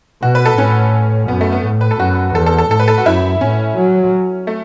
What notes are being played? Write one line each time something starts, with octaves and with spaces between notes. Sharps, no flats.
B2 F#4
B4
A4
A2 C#4
F#2 B3
A3
B3
A2
B4
A4
F#2 F#4
E2 A4
A4
A4
A2 A4
B4
A4
F#4
F#2 E4
A2 C#4
F#3
A3